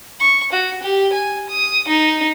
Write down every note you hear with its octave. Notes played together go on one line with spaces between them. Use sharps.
C#6
F#4
G4
G#5
D#6
D#4